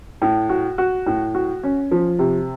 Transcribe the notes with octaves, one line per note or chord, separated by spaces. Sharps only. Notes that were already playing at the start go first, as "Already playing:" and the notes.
A2
F#4
F#4
A2
F#4
C#4
F3
C3